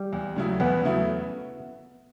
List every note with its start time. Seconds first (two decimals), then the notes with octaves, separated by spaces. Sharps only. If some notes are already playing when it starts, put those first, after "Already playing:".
Already playing: G3
0.13 E2
0.36 C#3 F#3 A3 E4
0.60 E2 B3
0.83 C#3 F#3 A3 E4